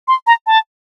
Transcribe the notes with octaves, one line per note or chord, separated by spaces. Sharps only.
C6
A#5
A5